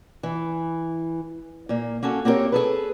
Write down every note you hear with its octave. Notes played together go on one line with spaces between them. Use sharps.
E3
A#2 A#3
A#3 C#4 F#4 A4
A#3 C4 G4 G#4 A#4 C#5
G#4 A4 B4